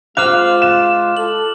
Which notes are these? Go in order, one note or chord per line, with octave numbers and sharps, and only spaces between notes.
G#3 F4 C5 F5 D6 F6 F#6
E7
A4 F#7